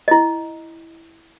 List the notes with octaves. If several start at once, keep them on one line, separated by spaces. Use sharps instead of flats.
E4 D#5